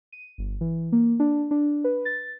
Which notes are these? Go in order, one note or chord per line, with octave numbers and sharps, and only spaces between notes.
D#7
G1
E3
A#3
D4
D4
B4
A6